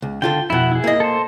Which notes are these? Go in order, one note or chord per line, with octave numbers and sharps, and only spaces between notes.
C#2
D3 F4 A4 G5
F2 B2 E4 F#5
E4 G#4
A#3 D#5
A4 C5